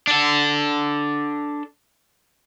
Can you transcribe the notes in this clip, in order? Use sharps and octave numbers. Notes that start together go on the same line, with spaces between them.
D4 A4